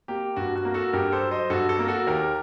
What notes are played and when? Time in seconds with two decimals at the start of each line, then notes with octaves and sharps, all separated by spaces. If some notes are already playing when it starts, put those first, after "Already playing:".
0.08 A#3 G4
0.36 G2 F#4
0.56 F#4
0.65 A#3
0.74 F#4 A4
0.93 G2 G4 A#4
1.12 A4 C5
1.23 F#3
1.31 C5 D#5
1.50 G2 F#4 A4
1.69 F#4 A4
1.79 A#3
1.88 F#4 A4
2.07 D#2 G4 A#4